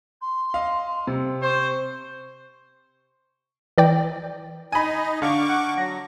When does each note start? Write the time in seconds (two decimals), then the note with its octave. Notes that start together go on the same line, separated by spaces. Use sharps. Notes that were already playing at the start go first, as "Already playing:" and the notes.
0.21 C6
0.54 D#5 F5
1.07 C3
1.42 C5 C#6
3.78 E3 D5 G5
4.72 D#4 D#5 G#5 B5
5.22 D3 F5 C#6 D6
5.49 F#5
5.78 F#3 A#6